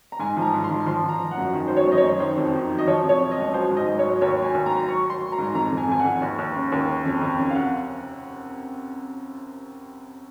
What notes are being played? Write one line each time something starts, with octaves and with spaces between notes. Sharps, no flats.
A#5
G#2 G#5
F3 A#5
G#2
C6
F3
F3 C6
F3
A#5
F3
F#5
F#2
D#3
F#3 C5
C#5
F#2
D#5
C#5
F#2
D#3 C5
F2
D#3
F#3
D#5
F3 C#5
C3
C#5
C3
D#5
C#2
F#3 C5
G#2
D#5
F#3
C#5
F#3
D#2 C#5
F#3
G#5
D#2
A#5
F#3
F#3 C#6
F#3
C6
F#3
A#5
G#2
F2 A#5
F2
G#5
F2 G#5
F2 F#5
D#2
D#2
C#3
D#2
C#3
F2
F2
C#3
F5
C3 F#5